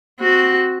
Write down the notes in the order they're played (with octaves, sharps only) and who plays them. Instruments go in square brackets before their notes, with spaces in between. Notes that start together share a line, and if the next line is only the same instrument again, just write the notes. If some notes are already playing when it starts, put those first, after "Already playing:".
[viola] C4 F#4